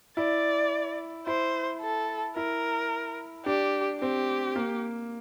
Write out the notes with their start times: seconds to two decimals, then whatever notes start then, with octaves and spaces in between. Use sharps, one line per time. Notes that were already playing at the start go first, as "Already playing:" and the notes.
0.17 E4 D5
1.27 E4 C5
1.82 A4
2.36 E4 A#4
3.46 D4 G4
4.01 C4 G4
4.56 A#3